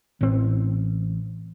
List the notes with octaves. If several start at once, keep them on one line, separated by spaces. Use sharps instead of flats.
A1 A2 E3 C4